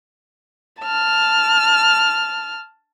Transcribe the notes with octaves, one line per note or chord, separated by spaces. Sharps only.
A5 F6